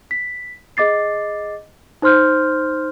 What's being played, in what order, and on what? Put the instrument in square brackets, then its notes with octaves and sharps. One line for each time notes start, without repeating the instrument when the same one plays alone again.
[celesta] B6
G#4 D#5 D6 A6 C7
D#4 C5 C6 F6 G6